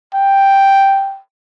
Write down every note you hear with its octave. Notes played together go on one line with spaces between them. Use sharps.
G5